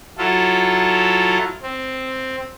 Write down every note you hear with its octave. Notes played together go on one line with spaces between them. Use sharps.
F#3 E4 F4 A4
C4